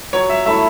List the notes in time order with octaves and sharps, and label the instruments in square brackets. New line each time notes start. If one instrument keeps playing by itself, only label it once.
[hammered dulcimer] F#3 [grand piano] C#5
[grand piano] E5
[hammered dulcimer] A3 E4 [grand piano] E5